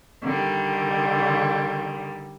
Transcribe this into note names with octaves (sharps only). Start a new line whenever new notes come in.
D3 D#3 G3